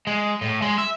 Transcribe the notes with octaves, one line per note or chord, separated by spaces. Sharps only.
G#3
A2
G#3
E5